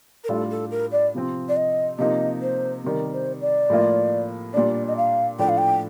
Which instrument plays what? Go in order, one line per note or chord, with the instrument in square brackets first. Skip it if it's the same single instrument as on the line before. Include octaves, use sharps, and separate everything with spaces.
[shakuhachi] A#4
[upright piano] A2 G3 D4 F4 [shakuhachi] A4
[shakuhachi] A4
A#4
D5
[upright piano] C3 F3 C4
[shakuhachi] D5
D#5
[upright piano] C3 F3 A#3 D#4 [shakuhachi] D#5
[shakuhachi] C5
[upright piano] C3 D#3 G3 [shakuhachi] A#4
[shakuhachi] C5
D5
[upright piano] A2 F3 A#3 F4
[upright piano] A#2 G3 D4 [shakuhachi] D5
[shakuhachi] D#5
F5
[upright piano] A2 F3 A3 D4 [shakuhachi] G5
[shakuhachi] F5
G5